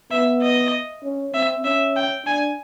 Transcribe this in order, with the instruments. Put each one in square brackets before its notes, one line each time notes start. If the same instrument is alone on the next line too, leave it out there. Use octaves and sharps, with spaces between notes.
[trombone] B3 [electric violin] E5
[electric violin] D#5
[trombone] C#4
[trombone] C4 [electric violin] E5
[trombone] C#4 [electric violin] E5
[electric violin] G5
[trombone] D4 [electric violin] G#5